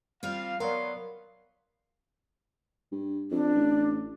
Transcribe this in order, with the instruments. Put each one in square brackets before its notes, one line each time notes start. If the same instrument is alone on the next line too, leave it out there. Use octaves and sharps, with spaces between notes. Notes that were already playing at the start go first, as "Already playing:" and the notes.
[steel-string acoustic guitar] G3 C4 F4 [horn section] F5
[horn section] F#3 B3 C6 [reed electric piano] A#4 D5 [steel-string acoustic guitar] F5
[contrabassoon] G2
[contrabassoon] F2 [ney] D4
[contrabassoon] A1